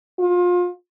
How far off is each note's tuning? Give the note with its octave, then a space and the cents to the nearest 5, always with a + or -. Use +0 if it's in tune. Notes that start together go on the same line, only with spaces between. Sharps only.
F4 +30